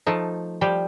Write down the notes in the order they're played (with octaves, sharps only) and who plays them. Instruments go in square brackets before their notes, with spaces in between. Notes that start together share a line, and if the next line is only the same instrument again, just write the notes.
[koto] F3 A3 D#4
F3 G3 G4